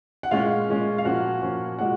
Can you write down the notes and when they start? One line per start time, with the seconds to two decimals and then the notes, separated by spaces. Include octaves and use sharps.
0.23 F#5
0.31 A#2 G#3 C#4 F4 F5
0.68 A#2 G#3 C#4
0.98 F5
1.05 A#2 F3 A#3 C#4 F#4 F#5
1.42 A#2 F3 A#3 C#4
1.79 A#2 G#3 F#4 F#5